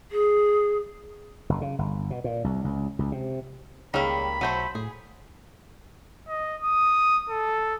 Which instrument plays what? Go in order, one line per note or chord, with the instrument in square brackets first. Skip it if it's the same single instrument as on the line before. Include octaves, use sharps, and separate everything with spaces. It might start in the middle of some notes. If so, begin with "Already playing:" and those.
[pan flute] G#4
[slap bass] F#1
C#3
G1
B2
A#2
C2
C#2
C#2
C3
[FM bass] C#2 [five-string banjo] D#3 G3 A#3 [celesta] G#4 C#5 E6 [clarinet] B5
[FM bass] B1 [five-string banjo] F#3 A3 C5 [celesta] C6 G6 D#7
[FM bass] A2 [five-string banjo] G#4
[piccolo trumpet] D#5
D#6
A4